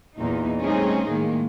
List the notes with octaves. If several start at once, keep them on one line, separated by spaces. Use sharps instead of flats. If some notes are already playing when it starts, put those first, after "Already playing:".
E2 A#2 D#4
G3 A3 C4 C#4 D#4 G#4
A2 D#3 G#3 A#3